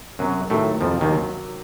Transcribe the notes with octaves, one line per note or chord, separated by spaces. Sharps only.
F#2 C3 F#3
A2 D#3 F#3 A3
F2 C3 F3
D#2 D#3
F#3